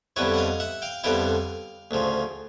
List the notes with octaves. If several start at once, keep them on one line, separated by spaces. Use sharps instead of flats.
F2 D3 G3 B3 E4 B4 C#5
F#5
D#5 F5
E5 F#5
F5 G5
F2 D3 G3 B3 E4 F5 G5
D2 C#3 F3